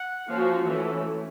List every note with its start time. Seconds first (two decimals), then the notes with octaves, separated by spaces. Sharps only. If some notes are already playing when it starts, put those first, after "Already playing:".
Already playing: F#5
0.28 F3 A#3 C#4 F#4 F5
0.67 E3 A3 C#4 E5